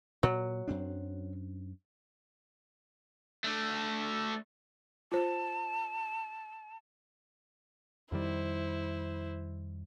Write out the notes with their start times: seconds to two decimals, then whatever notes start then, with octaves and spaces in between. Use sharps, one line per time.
0.23 A#2 F#3
0.68 F#2 C4 D4
3.44 A3 D4
5.12 F4 C5 A5
8.12 F2 D#3 G3 E4 C5